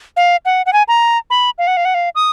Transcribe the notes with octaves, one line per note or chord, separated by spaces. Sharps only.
F5
F#5
F#5
G#5
A#5
B5
F5
F#5
F5
F#5
F5
D#6